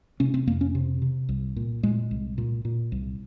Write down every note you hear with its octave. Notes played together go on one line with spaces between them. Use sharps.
C3 C#4
C4
F2 A#3
C#4
C3
C3
C2
A#2
A#2 G#3
C2
A#2
A#2
C2